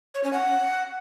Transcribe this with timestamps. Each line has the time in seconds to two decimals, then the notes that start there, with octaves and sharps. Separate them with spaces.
0.14 C#5
0.24 C#4
0.33 F#5